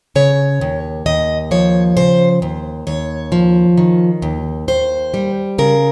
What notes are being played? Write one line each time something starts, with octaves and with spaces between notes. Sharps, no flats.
C#3 C#5
D#2
D#2 D#5
F3 C#5
C#3 C5
D#2
D#2 C#5
F3
D#3
D#2
D#2 C5
G3
C#3 A#4